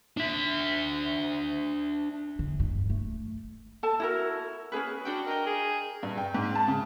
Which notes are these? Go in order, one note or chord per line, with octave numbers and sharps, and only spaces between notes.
D4 E5
D3
G2
A3
A4 A5
E4 F#4 A#4
C#4 D4 G#4 B4
D4 F#4 G5
A#4 D#5 G5
G#4
G2
G5
G#2
A5
C#3